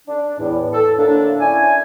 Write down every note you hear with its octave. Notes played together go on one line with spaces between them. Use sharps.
D4
E2 A2
A4
A2 D3 A#3 D4
C#4 E4 D5 G#5